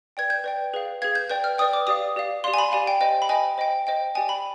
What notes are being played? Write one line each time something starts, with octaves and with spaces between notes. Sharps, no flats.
B4 D5 G5 G#6
G6
B4 D5 G5
G#4 B4 F5
G#4 B4 F5 G#6
G6
B4 D5 G5 G6
F6
B4 D5 G5 D#6
D6
G4 D5 F5 D#6
G4 D5 F5
G4 D5 F5 C6
G#5
B5
G4 D5 F5 G#5
G5
C5 D#5 G5
B5
C5 D#5 G5 G#5
C5 D#5 G5
C5 D#5 G5
G4 D5 G5 G#5
B5